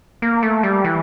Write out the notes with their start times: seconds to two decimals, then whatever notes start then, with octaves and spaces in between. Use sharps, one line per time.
0.22 A#3
0.43 A3
0.63 G3
0.84 E3